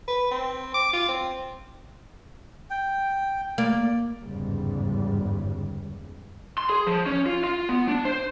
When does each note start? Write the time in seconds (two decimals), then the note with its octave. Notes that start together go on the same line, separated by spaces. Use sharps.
0.08 B4
0.31 C4
0.74 D6
0.93 F4
1.08 C4
2.70 G5
3.58 A#3 D5
4.21 G1 E2 G#2 C#3 G3
6.58 C6
6.70 G#4
6.87 F3
7.06 C#4
7.26 F4
7.44 F4
7.69 B3
7.88 D4
8.05 C5